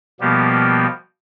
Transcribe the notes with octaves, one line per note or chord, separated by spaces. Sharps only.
B2 F3 G3 A#3 B3 G4